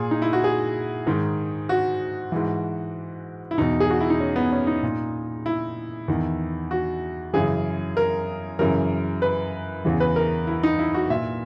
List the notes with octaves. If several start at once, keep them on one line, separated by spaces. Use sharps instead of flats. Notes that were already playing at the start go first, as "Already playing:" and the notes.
Already playing: A#2 G#4
D#4
E4
F#4
G#4
G#2 D#3
F#4
G#2 E3
E4
E2 B2 D#4
G#4
F#4
E4
D#4
C#4
B3
C#4
D#4
A#2
E4
E2 D#3
F#4
F#2 C#3 E3 G#4
A#4
F#2 C#3 E3 A#4
B4
E2 C#3 E3
B4
A#4
E4
D#4
E4
F#4
A#2 E5